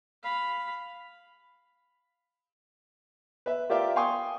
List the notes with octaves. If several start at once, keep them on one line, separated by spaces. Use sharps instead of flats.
F5 B5
B4 E5
F4 G4 A#4 D5 E5 F5
F5 G5 G#5 C6 C#6 D#6